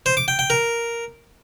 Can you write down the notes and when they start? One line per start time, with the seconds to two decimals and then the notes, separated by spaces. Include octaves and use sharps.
0.06 C5
0.17 D6
0.28 G5
0.39 G5
0.50 A#4